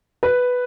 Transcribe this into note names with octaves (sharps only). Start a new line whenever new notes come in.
B4